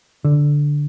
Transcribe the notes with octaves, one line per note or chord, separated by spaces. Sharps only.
D3